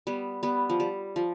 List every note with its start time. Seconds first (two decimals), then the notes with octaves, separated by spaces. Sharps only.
0.07 G3 B3
0.43 G3 B3
0.70 F3
0.80 G3
1.16 F3